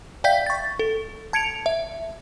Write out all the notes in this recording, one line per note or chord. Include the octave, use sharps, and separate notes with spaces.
D5 E5 F5 G5 G6 B6
C#6 A6
A4
A5 G#6 C#7 D7 F7
E5